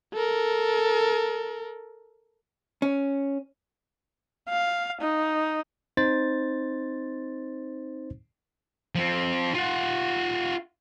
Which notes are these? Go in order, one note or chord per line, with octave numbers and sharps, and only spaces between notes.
A4 A#4
C#4
F5
D#4
C4 D#4 C5 A6
F3 C4
F4 F#5